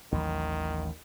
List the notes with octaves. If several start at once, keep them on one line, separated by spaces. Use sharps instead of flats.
A1 D#2 D#3 F#3